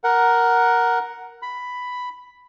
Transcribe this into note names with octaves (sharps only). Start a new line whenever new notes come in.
A#4 F#5
B5